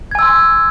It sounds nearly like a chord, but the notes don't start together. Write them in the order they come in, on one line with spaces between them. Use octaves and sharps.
G#6 G#5 E6 C6